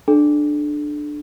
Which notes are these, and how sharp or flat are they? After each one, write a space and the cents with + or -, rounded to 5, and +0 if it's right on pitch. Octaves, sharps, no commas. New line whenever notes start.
D4 +15 A4 -35